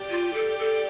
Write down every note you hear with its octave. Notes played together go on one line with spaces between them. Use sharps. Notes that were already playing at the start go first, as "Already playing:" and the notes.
Already playing: G4 D5 G5
F4
A4
A4